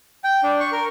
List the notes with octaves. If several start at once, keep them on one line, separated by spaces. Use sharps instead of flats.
G5
D4
C#6
A#4